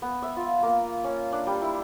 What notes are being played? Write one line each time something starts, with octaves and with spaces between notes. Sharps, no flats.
B3
E5
F4
A#3
C#4
D4
G3
E4